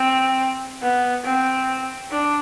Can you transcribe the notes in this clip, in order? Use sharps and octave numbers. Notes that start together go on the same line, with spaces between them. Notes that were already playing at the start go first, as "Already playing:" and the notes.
Already playing: C4
B3
C4
D4